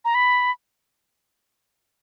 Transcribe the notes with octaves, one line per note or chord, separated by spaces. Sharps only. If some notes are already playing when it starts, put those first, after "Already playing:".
A#5
B5